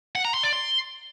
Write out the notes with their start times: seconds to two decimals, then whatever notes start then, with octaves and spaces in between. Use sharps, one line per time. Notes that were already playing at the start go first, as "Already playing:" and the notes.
0.15 F#5
0.25 A#5
0.34 C6
0.43 D5
0.53 C6